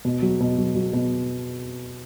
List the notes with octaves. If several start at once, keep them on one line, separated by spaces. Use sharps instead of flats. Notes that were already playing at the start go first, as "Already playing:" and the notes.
B2
F#3
B2
F#3
F#3
B2